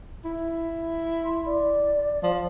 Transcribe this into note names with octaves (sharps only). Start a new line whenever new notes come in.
E4
C6
D5
F3